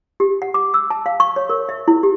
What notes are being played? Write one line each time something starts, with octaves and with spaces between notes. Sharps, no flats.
G4
F#5
D6
E6
A5
F5
C#6
C#5
A#4
E5
E4
G4